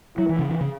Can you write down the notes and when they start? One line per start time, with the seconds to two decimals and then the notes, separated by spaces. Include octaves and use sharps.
0.17 F#3 E4
0.29 E3
0.39 C#3
0.49 E3
0.61 C#3